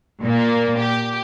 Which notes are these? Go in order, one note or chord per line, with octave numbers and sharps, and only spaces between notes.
A#2 A#3
G4